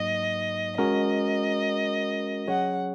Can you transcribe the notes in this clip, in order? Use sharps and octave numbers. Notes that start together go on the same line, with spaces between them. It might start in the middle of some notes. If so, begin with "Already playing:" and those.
Already playing: G#2 F#3 A#3 D#4 D#5
G#3 C#4 F#4 A#4 D#5
F#3 C#4 G#4 C#5 F#5